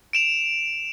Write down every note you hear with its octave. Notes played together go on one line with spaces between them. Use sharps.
D7 E7 F7